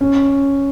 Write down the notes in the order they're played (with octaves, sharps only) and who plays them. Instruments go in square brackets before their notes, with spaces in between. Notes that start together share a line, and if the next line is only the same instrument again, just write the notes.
[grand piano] C#4